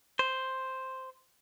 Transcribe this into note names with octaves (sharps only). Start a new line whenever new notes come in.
C5